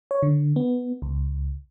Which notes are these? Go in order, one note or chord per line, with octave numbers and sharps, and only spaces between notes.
C#5
D3
B3
C#2